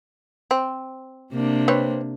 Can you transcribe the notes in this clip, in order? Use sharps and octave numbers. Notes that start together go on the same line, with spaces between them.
C4
C3 A#3 D4
C4 B4 C#5